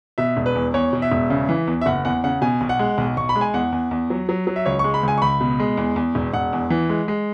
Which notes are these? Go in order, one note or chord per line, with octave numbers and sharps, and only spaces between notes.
B2 E5
E1
B4
E2
E2 C#5
B2
E5
E1
C#3
E3
E2
E5
F#1 F#5
E2 F#5
C#3 F#5
B2 G#5
B1
F#5
G#3
B1
B1 C#6
B5
G#3
G#5
E2 F#5
E2
E2
F#3
F#3
F#3
E5
C#2 C#5
C#6
G#3
B5
C#2 G#5
C#6
C#2 B5
B2
G#3
E2
E2
E1
E1 F#5
E2
E3
G#3
G#3